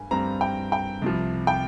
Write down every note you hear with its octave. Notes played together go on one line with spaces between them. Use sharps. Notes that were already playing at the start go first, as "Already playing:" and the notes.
Already playing: G2 G3 G#5
G2 G3 C4 A#5
G5
G5
C2 C3 F3
G5